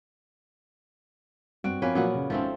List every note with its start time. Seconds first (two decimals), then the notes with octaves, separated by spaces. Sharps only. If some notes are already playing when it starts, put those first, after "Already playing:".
1.64 G2 C4 F#4 D7
1.82 F3 A#3 C4 C#4 F4 B4
1.95 A#2 F3 F#3 A#3 B3 F#4
2.14 C#3
2.30 G#1 F3 A3 C4 C#4